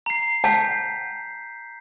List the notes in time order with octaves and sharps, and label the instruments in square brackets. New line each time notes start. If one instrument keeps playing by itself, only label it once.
[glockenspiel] A#5 C7
[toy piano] F#5 G5 A5 [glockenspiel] G6 B6